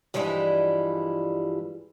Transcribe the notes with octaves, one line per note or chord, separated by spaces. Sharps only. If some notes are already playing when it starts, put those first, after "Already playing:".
G2 E3 F3 G3 G#3 E4